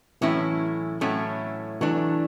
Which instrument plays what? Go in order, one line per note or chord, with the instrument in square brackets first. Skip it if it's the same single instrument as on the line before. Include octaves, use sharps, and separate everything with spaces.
[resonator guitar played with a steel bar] A2 F#3 A3 C#4 E4 [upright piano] E3
[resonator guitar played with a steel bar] A2 F#3 A3 C#4 E4
[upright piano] E3 [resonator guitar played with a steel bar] F#3 A3 D4